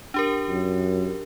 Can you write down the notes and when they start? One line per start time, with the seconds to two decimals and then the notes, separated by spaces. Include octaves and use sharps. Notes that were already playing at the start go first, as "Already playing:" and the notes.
0.14 D4 G4 A#4
0.48 F#2